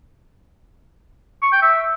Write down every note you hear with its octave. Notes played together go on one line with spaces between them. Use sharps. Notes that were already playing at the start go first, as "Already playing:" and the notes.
C#6
G5
E5